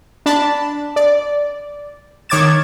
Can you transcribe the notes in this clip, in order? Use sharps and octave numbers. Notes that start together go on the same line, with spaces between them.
D4 A5 B5
D5
D#3 C#5 D6 G#6 A6 E7